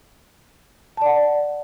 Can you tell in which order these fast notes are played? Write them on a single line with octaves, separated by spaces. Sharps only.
A5 D5 F#5